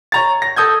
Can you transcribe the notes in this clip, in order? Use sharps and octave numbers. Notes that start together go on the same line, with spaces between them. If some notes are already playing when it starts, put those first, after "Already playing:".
C#5 A#5 A6
A#6
A4 D#6 G6 G#6